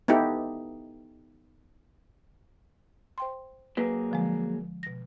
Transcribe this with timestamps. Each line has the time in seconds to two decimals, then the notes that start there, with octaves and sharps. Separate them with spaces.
0.08 B3 D#4 E4 G4 A4
3.18 C5 G5 C6
3.77 F#3 A#3 G#4 B4
4.11 D3 F3 G#3
4.83 B2 A#6